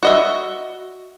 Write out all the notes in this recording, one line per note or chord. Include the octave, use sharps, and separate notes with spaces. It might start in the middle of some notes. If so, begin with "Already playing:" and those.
F#4 D#5 E5